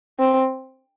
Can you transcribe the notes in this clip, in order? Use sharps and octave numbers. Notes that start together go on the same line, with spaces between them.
C4